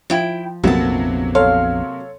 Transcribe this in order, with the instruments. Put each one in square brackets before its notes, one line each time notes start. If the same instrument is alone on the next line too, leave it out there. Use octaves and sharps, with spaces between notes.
[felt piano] F3 [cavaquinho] E4 G5
[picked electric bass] A#1 F2 B3 [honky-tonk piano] C3 F#3 A#3 [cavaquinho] E5 A5
[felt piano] A4 C#5 C6 [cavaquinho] F5